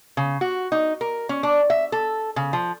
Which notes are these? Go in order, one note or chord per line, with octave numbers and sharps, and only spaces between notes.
C#3
F#4
D#4
A#4
C#4
D4
E5
A4
C#3
F3